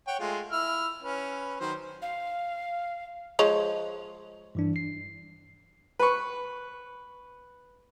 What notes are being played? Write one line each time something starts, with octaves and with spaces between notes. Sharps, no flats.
C#5 F#5 G5
G#3 A3 F4
E4 E6 F6
C#4 B4
D#3 F#3 C5
F5
F3 G#3 C#5
G2 E3 D4
C7
B4 C#6